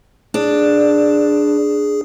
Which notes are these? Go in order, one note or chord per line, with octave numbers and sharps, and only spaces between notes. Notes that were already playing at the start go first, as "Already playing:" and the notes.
D4 G#4